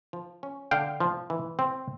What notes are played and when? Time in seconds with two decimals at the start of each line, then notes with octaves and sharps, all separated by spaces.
0.13 F3
0.43 C#4
0.71 D3 F5 G5
1.00 F3
1.30 E3
1.59 C4